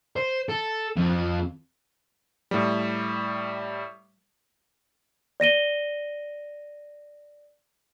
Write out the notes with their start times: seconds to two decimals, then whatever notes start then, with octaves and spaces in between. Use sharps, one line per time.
0.16 C5
0.49 A4
0.96 F2
2.51 A2 G3
5.40 D5 A#6 D#7 G7